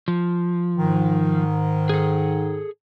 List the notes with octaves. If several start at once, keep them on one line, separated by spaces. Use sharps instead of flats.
F3
G#2 D#3
G#4 A4